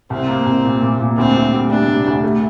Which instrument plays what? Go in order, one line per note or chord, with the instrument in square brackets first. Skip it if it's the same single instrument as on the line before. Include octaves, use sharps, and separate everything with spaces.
[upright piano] C2 [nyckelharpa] C4
[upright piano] A#3
C2
A#2
A#2
A#2
[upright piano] D2 [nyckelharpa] C4
[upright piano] D2
G3
[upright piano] G3 [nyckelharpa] D4
[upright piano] C3
D2
A3